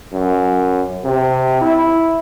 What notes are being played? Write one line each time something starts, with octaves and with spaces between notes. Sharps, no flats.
F#2
C3
E4